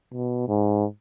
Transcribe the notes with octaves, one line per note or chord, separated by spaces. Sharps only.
B2
G#2